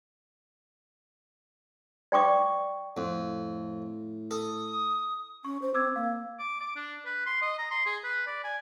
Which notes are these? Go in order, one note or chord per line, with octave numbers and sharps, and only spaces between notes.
D5 G5 C#6 D6
F2 A2
A4 D#6
C#4 C#6
C5
C4 D6 E6 G#6
A#3 F5
D6
D6
D4
B4
C6
D#5
A#5
C6
G#4
B4
D5
G#5